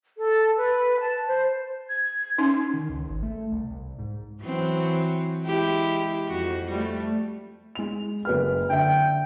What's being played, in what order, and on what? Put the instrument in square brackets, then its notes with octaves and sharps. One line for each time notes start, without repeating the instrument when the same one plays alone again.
[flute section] A4
B4
A5
C5
[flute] G#6
[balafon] C#4 D#4 [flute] C6
[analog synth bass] D#3
C#2
G#1
A3
C2
C2
G#2
[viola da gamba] E3 F#3 C4
G#3 E4 G4
F2 F#4
G3 A3
[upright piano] G#3 F7
F#1 B4 F6
[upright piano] D3 E5 [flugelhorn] G5